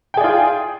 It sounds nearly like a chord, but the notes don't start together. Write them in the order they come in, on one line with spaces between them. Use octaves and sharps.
G5 G#4 D5 F4